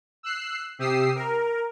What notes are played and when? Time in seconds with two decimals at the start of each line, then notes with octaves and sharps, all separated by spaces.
0.23 E6 F#6 C7
0.79 C3 G4 D#6 E6 C7
1.16 A#4